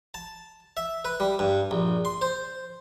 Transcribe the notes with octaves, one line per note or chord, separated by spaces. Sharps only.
A5
E5
B4
G3
G2
A#1
C6
C5